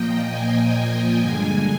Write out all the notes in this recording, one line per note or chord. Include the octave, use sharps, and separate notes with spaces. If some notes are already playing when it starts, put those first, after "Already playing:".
Already playing: A#2 F3 A#3 D#5 G5
G#5
G2 D3 G#3 G#5